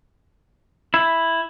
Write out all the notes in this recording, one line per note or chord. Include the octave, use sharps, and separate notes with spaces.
E4